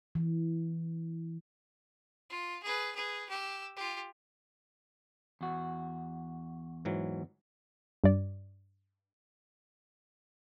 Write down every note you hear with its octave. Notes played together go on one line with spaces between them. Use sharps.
E3
F4
G#4 B4
G#4 B4
G4 E6
F4 G4
E2 F#4
G#2 E3 F#3
G2 D5